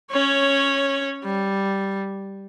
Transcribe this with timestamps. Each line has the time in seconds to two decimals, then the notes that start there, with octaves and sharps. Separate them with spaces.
0.12 C#4 C#5
1.25 G3